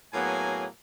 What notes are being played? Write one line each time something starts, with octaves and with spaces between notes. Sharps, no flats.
A2 F#3 A#3 B3 G#4 G#5